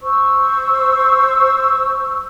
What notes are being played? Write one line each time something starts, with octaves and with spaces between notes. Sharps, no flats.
C5 C#6 E6